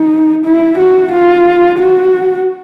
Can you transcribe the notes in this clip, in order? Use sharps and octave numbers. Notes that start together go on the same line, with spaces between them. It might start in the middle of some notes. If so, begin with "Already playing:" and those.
Already playing: D#4
E4
F#4
F4
F#4